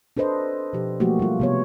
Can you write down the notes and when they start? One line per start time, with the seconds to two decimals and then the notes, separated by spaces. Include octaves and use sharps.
0.17 D4 A4 B4 C5 D#5
0.73 B2 F3 G4
1.00 F3 F#3 A3 A#3 F#4 G4
1.19 G3 F4
1.40 C3 B3 C#5